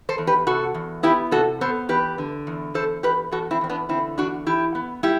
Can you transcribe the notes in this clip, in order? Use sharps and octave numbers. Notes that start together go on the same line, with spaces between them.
A4 C5
E2
G4 B4
C3 F#4 A4
E2
B3 E4 G4
C3 F#4 A4
B3 A4 C5
E2 G4 B4
D3
E2
E2 A4 C5
E2 G4 B4
E2 F#4 A4
C4 E4
E2 C4
B3 D4
D3 C4 E4
E2 D4 F#4
E3 E4 G4
B3
G3 E4 G4